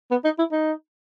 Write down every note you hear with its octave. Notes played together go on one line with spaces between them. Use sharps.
B3
D#4
E4
D#4